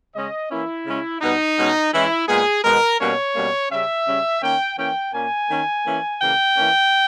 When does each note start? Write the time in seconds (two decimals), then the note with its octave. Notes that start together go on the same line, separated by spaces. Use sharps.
0.15 C#3 G#3 C#4 D#5
0.50 E3 A#3 C#4 E4
0.86 C#3 G#3 C#4
1.21 B2 G3 B3 D#4
1.57 B2 G#3 C#4
1.93 E3 G#3 C#4 E4
2.28 A#2 G#3 B3 G#4
2.63 B2 G#3 B3 A#4
3.00 B2 G3 A#3 C#4 C#5
3.35 B2 G3 A#3 C#4
3.71 C#3 G3 C#4 E5
4.06 C#3 G3 C#4
4.42 D#3 A#3 C#4 G5
4.77 E3 A#3 C#4 G5
5.13 A#2 A#3 C#4 G#5
5.49 D#3 A#3 C#4
5.85 E3 A#3 C#4
6.20 C#3 E3 A#3 G5
6.56 E3 A#3 C#4